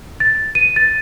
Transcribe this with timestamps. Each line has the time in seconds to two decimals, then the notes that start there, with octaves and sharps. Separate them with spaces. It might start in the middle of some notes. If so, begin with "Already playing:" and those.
0.20 A6
0.55 D#7
0.76 A6